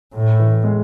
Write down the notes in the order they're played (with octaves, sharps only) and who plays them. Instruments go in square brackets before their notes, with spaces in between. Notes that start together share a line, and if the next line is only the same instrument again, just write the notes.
[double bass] A2
[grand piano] E3
G#3